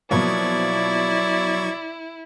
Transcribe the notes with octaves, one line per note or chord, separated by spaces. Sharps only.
B2 F3 F#3 A#3 E4 D5 C#6 G#6